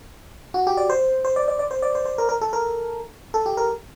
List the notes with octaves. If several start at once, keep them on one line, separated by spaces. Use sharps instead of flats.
F#4
G4
D5
C5
C5
D5
D5
D5
C5
D5
C5
C5
A#4
A#4
A4
A#4
A4
G4
A#4